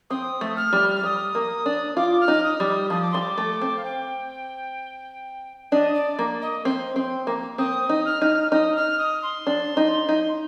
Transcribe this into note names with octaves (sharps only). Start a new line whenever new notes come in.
C4 D#6
A3
F6
G3
F6
G3 D#6
A#3
D4
F4 D6
F6
D#4
D#6
G3
D#6
F3 D#6
D6
G3 C6
D6
A3
C4
F5
G5
D4 D#5
D5
A#3
D#5
C4
C4
A#3
C4 D#6
D#4
F6
D#4
D#4 D#6
F6
D#6
C6
D4
D#4
D#4